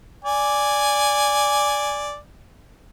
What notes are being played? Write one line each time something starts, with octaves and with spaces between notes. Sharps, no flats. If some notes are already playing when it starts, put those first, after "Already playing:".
D5 G#5